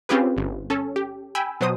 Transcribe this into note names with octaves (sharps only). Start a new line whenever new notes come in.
C4 C#4 F4 G4 G#4 B4
G1
C#4 A4
G4
G5 G#5 B5 E6
B2 F#3 C5 D#6